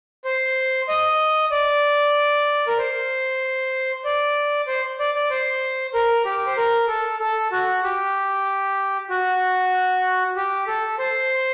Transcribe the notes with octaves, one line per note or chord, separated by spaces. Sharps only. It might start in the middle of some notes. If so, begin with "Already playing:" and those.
C5
D#5
D5
A#4
C5
D5
C5
D5
D5
C5
A#4
G4
C5
A#4
A4
A4
F#4
G4
F#4
G4
A4
C5